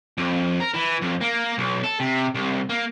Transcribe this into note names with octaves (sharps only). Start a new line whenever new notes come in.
F2
A#4
E3
F2
A#3
B1
A4
C3
C2
A#3